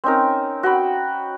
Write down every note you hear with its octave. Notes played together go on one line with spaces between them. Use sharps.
C4 C#4 D#4 A#4
F#4 G5 B5